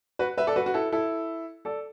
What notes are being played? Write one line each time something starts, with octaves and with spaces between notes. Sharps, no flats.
F#4 B4
B4 E5
A4 D5
F#4 B4
F#4
E4 A4
E4 A4
A4 D5